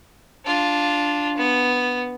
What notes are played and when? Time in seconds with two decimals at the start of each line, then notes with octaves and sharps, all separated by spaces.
0.45 D4 F4
1.37 B3